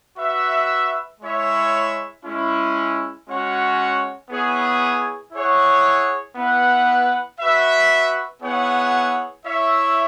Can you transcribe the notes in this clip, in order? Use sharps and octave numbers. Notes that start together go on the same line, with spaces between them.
F#4 B4 E5
G#3 E4 C#5 E5
G#3 C#4 E4
G#3 C#4 F#4 C#5 F#5
B3 E4 G#4 C#5
E4 G#4 C#5 F#5
B3 E4 B4 F#5
F#4 B4 E5
B3 E4 G#4 C#5 F#5
E4 C#5 E5